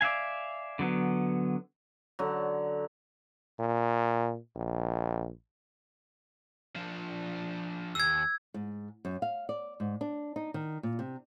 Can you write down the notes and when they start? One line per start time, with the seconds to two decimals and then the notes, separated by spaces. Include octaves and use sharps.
0.01 D5 E5 F5 G#5
0.79 D3 F#3 B3
2.19 D3 F#3
3.59 A#2
4.56 A#1
6.76 F3 D4
7.95 D#2 E6 G#6
8.54 G#2
9.05 F#2
9.22 F5
9.49 D5
9.80 G#2
10.01 D4
10.36 D#4
10.54 D#3
10.83 A#2
10.99 C3